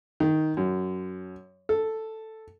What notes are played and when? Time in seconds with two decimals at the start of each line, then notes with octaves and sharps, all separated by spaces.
0.20 D#3
0.57 F#2
1.69 A4